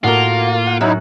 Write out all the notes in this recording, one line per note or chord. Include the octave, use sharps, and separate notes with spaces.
A2 A#3 F4 F#4 A#4
F#5
F#2 F#3 D#4 E4 F#6